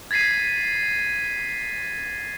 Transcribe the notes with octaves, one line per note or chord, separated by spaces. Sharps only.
G#6 A6 B6 C7 D#7